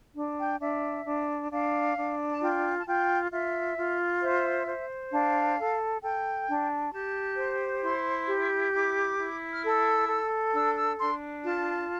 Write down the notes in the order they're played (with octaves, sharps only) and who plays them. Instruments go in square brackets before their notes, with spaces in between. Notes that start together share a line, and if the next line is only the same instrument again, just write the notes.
[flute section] D4
G5
D4 E5
D4
D4 F5
D4
A5
F4 G5
A5
F4 G5
F4 E5
F4
C5 E5
C5
D4 F5
A4
A4 G5
D4
G4 A5
C5
E4 C6
G4
E4 D6
E4
F6
A4 E6
A4
D4 E6
E6
D4 C6
F4 A5